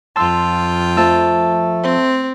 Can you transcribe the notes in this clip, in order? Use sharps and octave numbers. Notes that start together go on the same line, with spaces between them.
F2 F4 G5 A5 C6 E6
F3 A3 A5 E6
C4